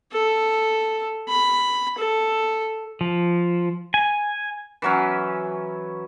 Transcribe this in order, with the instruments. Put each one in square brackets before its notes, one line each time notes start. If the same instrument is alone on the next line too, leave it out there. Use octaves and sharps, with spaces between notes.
[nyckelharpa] A4
B5
A4
[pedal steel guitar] F3
G#5
[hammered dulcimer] E3 F#3 C#4